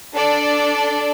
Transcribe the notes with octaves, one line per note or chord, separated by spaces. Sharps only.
D4 A4 D5